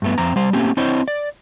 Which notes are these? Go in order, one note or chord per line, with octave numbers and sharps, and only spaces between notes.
G2 A3 B3
F2 C4 A#5
G3 C5
A3 A#3 C4 C#4 G4
C4 E4 C5 C#5 D#5
D5